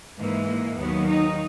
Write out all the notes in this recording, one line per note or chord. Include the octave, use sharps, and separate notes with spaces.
G#2 E3 A#3
A#3
D#2 D#3 F#3 B3
D#4